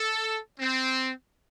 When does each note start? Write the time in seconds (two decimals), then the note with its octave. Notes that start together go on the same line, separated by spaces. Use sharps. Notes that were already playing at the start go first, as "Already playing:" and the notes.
Already playing: A4
0.59 C4